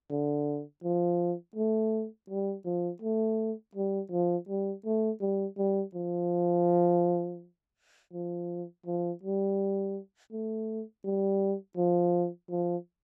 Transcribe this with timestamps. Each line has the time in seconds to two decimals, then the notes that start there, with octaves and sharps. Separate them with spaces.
0.11 D3
0.83 F3
1.56 A3
2.30 G3
2.65 F3
3.02 A3
3.75 G3
4.11 F3
4.48 G3
4.85 A3
5.21 G3
5.57 G3
5.94 F3
8.14 F3
8.86 F3
9.23 G3
10.32 A3
11.04 G3
11.77 F3
12.51 F3